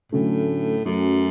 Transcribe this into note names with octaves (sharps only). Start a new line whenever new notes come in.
A2 D3 F#3 A3 C#4
F#2 F#3 A3 C#4